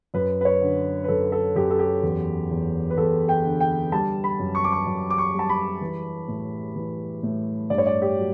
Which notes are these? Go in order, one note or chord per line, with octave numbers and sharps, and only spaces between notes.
F#2 B4
B4
C#5
D3
B4
F#2 A4
A4
F#2 G4
A4
G4
E2
E2
B4
E2 A4
G5
D3
G5
G3 A5
B5
F#2
C#6
D6
C#6
F#2
D6
C#6
G3
A5
B5
E3
A2
E3
A2
G2 D5
C#5
D5
G4
F#3